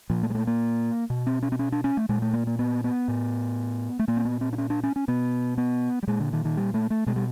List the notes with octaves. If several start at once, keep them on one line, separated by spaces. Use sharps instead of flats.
A#2 F3
A3
G#3
A3
A#3
B2
C4
C#4
C4
C#4
D4
C#4
A3
A#2 G#3
A3
A#3
A#3
B3
B3
A2
A3
A#2 A#3
C4
B3
C4
D4
C#4
D4
C#4
C#4
B2 B3
B3
G3
A#2 G#3
D3
D#3
D#3
G3
A3
A3
B2 G#3
G3